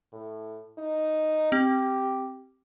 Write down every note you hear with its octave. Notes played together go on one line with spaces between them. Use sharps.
A2
D#4
C4 G4